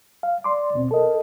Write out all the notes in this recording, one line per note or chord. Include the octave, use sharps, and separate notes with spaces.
F5
D5 C6 D6
D#2 B2 C4
A4 A#4 D#5